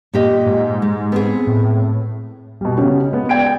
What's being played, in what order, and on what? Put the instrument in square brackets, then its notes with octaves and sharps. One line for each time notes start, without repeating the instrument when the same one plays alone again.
[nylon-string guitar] A#2 G4 D#5
[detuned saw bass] G#2
[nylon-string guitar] G#3
B3 C4 G#4
[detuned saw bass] A2
[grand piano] B2 G3
C#3 C#4 F#4 G4
G#3 B3
D5 G5 G#6 D7